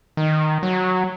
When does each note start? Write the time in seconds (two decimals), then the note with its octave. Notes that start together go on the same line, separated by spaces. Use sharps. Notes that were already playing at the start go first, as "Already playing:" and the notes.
0.17 D#3
0.63 F#3